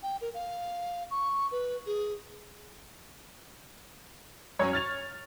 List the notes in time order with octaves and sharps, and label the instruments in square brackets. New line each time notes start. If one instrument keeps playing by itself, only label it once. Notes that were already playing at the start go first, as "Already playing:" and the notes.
[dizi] G5
A#4
F5
C#6
B4
G#4
[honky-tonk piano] F#2 F#3 C#4 [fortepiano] C#5
[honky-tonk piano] F6 A6 F7